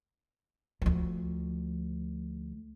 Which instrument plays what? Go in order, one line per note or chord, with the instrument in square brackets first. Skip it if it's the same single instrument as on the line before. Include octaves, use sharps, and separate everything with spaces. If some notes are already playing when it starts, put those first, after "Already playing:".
[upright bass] D2 F3